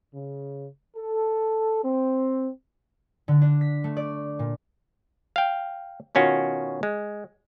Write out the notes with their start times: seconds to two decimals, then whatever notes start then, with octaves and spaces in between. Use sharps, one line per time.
0.13 C#3
0.97 A4
1.83 C4
3.28 D3
3.42 D4
3.61 B6
3.84 A3
3.97 D5
4.39 A#2
5.36 F5 G5
6.15 B2 D#3 C#4 F4 F#4
6.83 G#3